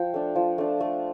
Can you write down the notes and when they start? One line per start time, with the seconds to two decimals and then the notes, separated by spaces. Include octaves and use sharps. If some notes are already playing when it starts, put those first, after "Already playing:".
Already playing: F3 G5
0.14 A3 D4
0.36 F3
0.58 A3 D4
0.81 A3